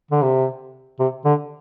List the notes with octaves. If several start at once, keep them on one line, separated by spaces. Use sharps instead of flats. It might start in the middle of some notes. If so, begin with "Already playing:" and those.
D3
C3
C3
D3